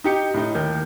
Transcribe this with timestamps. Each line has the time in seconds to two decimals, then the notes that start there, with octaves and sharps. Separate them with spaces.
0.04 D#4 G4 C#7
0.34 A2 D#4
0.55 D#2 A#4 G6